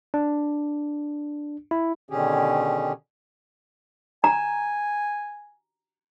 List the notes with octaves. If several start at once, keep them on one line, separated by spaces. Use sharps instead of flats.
D4
E4
B2 D3 D#3 C#4 G4 G#4
G#5 A#5